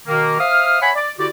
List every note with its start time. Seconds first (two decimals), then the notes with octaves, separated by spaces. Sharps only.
0.07 B2 D#3 A#3
0.39 C5 E5 F5 D#6 F6
0.82 C#5 E5 F#5 G#5 B5
0.96 D5
1.18 D3 E4 F#4 G4 D5